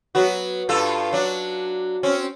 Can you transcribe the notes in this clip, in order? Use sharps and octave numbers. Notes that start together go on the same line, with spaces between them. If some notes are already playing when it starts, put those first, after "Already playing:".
F#3 B3 F#4
G2 F4 A4
F#3 D4
C4 C#4